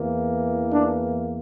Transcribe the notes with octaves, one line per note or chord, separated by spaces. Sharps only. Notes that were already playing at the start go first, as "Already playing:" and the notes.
Already playing: E2 E3 A#3
D4